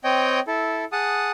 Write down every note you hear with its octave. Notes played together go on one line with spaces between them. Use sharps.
C4 C#5 D#5 G5
E4 A4
G#4 F#5 A5 D#6